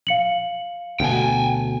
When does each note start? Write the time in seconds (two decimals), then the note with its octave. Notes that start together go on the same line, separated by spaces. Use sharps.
0.07 F5 C#7 F#7
1.00 D2 B2 G5 G#5